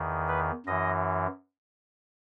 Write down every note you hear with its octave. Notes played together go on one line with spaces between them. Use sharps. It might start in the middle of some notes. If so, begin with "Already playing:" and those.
Already playing: E2 D#3
B4
F#2 E3 D#5